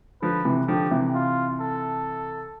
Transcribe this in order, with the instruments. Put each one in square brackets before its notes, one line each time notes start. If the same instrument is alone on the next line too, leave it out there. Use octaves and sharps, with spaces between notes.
[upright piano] D3 F3 [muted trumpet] B4
[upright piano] C3 E3
[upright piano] D3 F3 [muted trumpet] G4
[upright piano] C3 E3
[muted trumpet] F4
A4